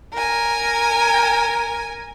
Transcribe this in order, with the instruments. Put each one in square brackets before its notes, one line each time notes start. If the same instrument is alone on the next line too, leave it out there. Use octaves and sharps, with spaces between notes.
[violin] A#4 G#5